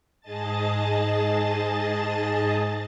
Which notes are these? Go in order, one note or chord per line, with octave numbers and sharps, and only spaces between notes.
G#2 G#4 D#5 A5 A6